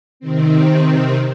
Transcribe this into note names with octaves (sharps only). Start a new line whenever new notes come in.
C3 D#3 C4